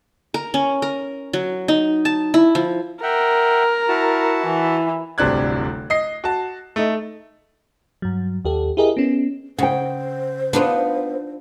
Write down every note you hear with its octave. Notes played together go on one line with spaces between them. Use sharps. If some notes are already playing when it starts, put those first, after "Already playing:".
A#4
C#4
A#4
F#3
D#4
A5
E4
F3
A#4 E5 F#5 G5
E4 F#4 A5
E3
D1 G1 C3 D4 F#6 G#6
D#5 C7
F#4 A5
A3 D#4
G2 F#3
D#2 G4 A4
E4 G4 G#4 A#4 D#5
B3 C#4
C#3 C5 F#5 G5
B3 D4 D#4 F4 B4